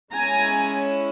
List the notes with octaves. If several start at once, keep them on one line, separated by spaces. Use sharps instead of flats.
G#3 C#4 E4 G#5 A#5